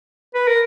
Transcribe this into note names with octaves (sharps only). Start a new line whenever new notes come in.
B4
A#4